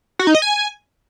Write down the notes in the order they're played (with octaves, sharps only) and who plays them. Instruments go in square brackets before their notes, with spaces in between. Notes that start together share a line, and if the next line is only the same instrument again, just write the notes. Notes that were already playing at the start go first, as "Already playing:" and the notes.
[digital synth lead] F#4
D#4
D#5
G#5